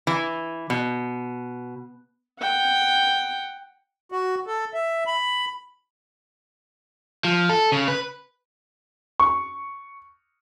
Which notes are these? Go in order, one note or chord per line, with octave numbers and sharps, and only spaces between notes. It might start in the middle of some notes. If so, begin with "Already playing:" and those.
E3
B2
F#5 G5
F#4
A4
E5
B5
F3
A4
C#3
B4
C#6